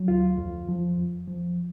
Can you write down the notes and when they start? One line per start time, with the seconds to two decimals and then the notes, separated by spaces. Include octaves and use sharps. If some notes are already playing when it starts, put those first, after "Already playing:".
Already playing: F#3
0.08 D2 F4
0.38 F2
0.69 F3
0.97 F2
1.27 F3